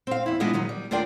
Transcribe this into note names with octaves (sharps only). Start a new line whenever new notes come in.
C4 F5
E2 E4
E3 G#3 B3 D4 F4 D#5
D#3 F#3 D#4
G3
D#2 D4 F4 A#4 D5 G5